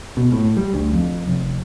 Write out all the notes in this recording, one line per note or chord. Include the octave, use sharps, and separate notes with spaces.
B2
A2
G3
D2
F2
F1